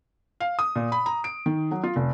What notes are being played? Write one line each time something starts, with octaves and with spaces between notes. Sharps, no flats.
F5
D#6
A#2
B5
A#5
D7
D#3
F#3
F4
F1